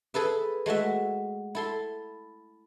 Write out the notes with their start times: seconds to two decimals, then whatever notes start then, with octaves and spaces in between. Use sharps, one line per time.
0.14 G#4 A4 B4 E5
0.66 G#3 A3 F#4 E5
1.55 E4 A4 C6